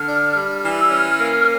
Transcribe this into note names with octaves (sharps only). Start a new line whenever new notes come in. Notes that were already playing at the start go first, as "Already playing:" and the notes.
Already playing: D3 F6
D4
G3
E3
E6
C#4 F6
A#3